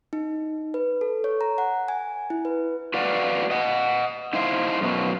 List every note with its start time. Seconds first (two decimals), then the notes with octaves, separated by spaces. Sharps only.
0.13 D#4
0.74 B4
1.01 A4
1.24 C#5
1.41 A#5
1.58 F#5
1.88 G#5
2.30 E4
2.45 B4
2.94 F#4 B4 D5 F5 F#5
3.50 D#5 F#5
4.33 D#4 E4 C5 F5
4.81 F#2 B2 F#3